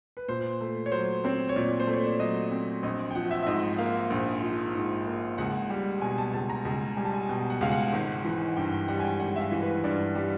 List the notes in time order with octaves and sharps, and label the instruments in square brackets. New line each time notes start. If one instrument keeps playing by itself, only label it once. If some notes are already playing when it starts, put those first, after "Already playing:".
[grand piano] B4
A#2 C5
A3
C#5
F#3 C5
C4 C#5
C#5
A#2 D5
C5
A3
C#5
D5
F#3 D#5
C4
A#1 D#5
G5
F3 F#5
E5
E5
G#2 D#5
A#3 F5
A#1
F3
G#2
A#3
C#2 F#5
G3
B2 G#5
A5
C#2 A5
A#5
C#2 A5
G3 G#5
A5
G#5
B2 G5
F#5
C#2 F5
F#5
G#1
E3
G2 G5
G5
G3 F#5
G#5
G5
G#1 F#5
E5
F5
E3
B4
G2 D5
G3